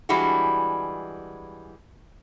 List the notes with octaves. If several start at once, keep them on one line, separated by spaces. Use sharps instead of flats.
E3 G3 G#3 D4 E4 F#4